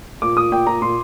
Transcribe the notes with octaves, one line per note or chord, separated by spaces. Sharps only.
A#2 D6
A#2 D#6
A#2 G5
A#2 A#5
A#2 C6